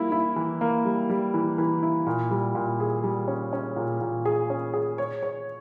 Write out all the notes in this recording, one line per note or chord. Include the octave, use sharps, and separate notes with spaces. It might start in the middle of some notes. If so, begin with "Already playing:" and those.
Already playing: G3 A#3 E4
E4
E3
A#3
G3
G3
E3
E3
E4
A#2
G3
A#2
G#4
G3
C#4
C#4
A#2
A#2
G#4
C#4
G#4
C#5
C#5